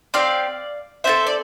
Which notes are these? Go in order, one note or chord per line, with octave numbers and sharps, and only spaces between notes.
C4 G4 D5 F5
C4 F4 A4 C5 E5
D5